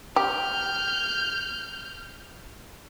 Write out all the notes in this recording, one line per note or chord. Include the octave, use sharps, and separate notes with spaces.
G4 F6 G6